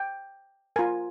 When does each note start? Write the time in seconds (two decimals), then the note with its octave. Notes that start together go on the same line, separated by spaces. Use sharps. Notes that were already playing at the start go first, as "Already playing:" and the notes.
Already playing: G5
0.76 F4 A#4 G#5